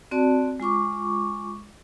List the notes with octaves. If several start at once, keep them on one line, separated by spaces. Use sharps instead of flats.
C4 F#4 D5 A5
G#3 F4 C#6 D6